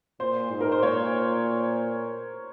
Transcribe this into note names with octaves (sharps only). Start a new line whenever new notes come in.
A#2 C5
G#2
A#4
C5
A#2 C#5